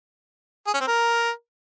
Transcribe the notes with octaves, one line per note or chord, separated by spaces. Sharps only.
G#4
C#4
C4
A#4